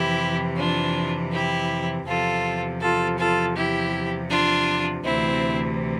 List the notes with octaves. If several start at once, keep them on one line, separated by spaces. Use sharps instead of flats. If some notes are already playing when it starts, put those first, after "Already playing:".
Already playing: F2 C3 E3 E4 G4
D4 F4
E4 G4
E2 C3 F3 F4 A4
F4 A4
F4 A4
E4 G4
D4 F4
D2 C3 E3 C4 E4